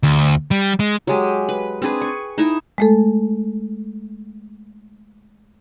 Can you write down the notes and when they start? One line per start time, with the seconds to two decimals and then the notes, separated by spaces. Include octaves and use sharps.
0.03 D2
0.51 G3
0.80 G#3
1.07 F#3 G#3 G4
1.49 B4
1.82 C4 D4 G#4 B4
2.01 C#6
2.38 D#4 E4 E5 A#5
2.78 G#3 A3 A4